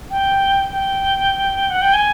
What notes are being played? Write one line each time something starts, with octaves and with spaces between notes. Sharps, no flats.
G5
G5
F#5
G5
G#5